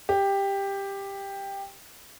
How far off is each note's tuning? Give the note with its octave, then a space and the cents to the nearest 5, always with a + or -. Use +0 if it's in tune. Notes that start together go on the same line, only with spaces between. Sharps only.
G4 +10